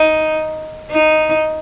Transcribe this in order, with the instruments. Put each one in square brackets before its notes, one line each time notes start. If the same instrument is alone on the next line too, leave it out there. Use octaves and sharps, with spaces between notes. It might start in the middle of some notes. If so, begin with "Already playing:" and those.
Already playing: [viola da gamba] D#4
D#4